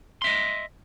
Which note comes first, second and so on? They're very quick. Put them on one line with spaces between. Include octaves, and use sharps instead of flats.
C6 E5 D#5